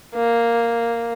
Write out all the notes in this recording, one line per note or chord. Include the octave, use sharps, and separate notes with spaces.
A#3